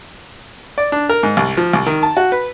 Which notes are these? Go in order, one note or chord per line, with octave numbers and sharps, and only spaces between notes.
D5
D4
A#4
G#2
C2
F3
C2
D#3
A5
F#4
B4